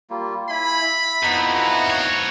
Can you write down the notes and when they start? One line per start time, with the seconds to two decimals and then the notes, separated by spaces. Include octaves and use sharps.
0.10 G3 A#3 F4
0.49 E4 G#5 B5
0.83 E5
1.23 F2 B3 D#4 E4
1.54 F#4
1.90 C4 C#5